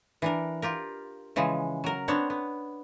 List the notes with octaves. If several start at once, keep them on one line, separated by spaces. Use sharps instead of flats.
E3 D4 A#4
F4 G4 A#4
C#3 E3 F3 G#3
F#3 A#4
B3 C4 D4 C#5
B3